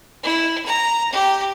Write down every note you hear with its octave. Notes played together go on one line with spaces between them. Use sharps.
E4
A#5
G4